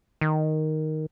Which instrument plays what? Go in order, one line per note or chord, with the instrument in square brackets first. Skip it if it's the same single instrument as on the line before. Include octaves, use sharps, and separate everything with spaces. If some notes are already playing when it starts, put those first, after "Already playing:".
[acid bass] D#3